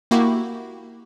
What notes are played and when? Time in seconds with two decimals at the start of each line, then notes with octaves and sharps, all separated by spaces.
0.11 A#3 E4 F#4 G4